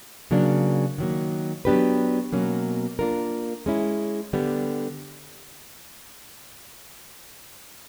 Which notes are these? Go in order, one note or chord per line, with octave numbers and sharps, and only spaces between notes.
C#3 F#3 A#3 D4
D#3 F#3 A#3
F#3 B3 D4 G4 B4
B2 F#3 A#3 C#4
A#3 D4 F4 A#4
G#3 C#4 E4
D3 G3 B3